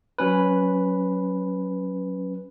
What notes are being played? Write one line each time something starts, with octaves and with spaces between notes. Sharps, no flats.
F#3 C#4 B4